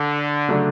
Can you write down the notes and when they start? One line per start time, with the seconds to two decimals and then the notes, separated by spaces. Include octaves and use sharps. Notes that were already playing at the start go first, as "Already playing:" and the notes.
Already playing: D3
0.48 C#3 F#3 A3 D4